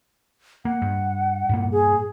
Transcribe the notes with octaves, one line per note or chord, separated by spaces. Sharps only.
A#3 F#5
G2
G2 A#2 A#3
G#4